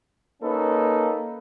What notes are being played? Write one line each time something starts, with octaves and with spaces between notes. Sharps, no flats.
A#3 C#4 D#4 A4 B4